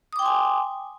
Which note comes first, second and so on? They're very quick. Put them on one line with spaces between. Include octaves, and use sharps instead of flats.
D#6 D6 G5 C6 G#5